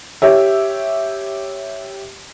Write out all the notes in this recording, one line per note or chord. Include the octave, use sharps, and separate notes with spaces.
G4 C#5 E5